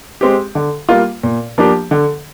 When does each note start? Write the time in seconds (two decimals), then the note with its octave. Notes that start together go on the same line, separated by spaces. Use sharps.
0.21 G#3 C4 G4
0.55 D3
0.89 G3 A#3 F4
1.23 A#2
1.58 F3 A#3 D4 G4
1.91 D3